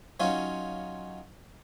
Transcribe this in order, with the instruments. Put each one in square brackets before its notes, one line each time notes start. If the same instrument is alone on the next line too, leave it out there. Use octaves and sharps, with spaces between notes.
[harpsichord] F#3 C#4 D#4 F4